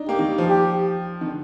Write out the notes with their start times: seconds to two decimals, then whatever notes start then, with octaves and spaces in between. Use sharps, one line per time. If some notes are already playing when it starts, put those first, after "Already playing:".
Already playing: D4 D#4
0.09 A#3 G4
0.19 D#3
0.29 G3
0.38 F3
0.48 G4
1.21 D#3
1.27 D3